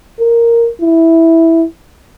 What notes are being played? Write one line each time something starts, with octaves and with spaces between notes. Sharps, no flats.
A#4
E4